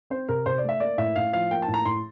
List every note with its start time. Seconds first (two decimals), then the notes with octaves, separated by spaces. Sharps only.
0.10 C4 C5
0.29 C3 A#4
0.46 C3 C5
0.58 D5
0.64 A3
0.69 E5
0.80 A#3 D5
0.98 A2 E5
1.16 A2 F5
1.33 F3 F5
1.51 A#3 G5
1.62 A5
1.68 A2
1.74 A#5
1.85 A2 C6